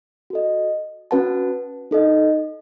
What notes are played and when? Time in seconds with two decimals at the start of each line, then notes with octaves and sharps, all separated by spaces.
0.30 F#4 A4 D#5
1.11 C#4 F#4 B4 F#5 A5
1.91 D#4 A4 D#5